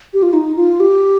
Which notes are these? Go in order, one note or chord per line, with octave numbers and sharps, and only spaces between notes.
G4
F4
D#4
F4
G4